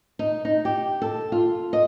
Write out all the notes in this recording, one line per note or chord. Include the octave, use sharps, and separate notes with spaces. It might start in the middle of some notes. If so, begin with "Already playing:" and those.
D#4
D#4
G4
A4
F4
D#5